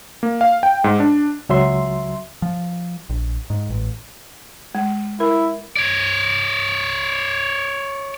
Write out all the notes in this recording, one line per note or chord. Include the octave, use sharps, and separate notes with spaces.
A#3
F5
G5
G#2
D4
C#2 F#3 E5 C6
F3
A#1
G#2
A1
G#3
E4 A#4
C#5 D5